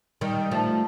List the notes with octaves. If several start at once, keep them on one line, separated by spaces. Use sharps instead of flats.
D#3 G3
F3 A3